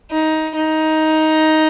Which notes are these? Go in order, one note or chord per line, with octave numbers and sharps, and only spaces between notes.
D#4
D#4